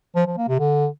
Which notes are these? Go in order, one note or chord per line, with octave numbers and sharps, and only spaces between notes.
F3
F3
A#3
C3
D3